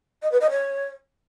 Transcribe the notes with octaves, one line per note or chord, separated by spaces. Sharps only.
D#5
B4
D#5
C#5